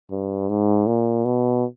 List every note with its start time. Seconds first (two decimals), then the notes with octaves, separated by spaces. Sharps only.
0.11 G2
0.49 G#2
0.87 A#2
1.25 B2